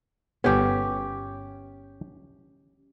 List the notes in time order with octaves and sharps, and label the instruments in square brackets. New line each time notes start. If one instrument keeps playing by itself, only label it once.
[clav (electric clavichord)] G1 B3 [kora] C#4 G4